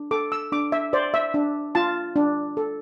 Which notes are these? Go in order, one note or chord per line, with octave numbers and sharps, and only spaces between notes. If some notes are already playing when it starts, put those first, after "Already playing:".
Already playing: D4
A4 D6
E6
D4 D6
E5
C5 D5
E5
D4
F4 A5
D4
A4